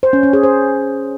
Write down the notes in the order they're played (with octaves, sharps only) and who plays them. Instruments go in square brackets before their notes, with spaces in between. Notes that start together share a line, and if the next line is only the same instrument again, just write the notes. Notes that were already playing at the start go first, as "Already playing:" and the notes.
[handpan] C5
C#4
C#4
G#4
C5